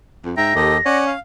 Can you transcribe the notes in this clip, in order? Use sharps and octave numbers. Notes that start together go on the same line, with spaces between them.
F2
G#2 E5 G5 A#5 A#6
D#2 G4 A4 D#5
C#4 D5 F#5
F5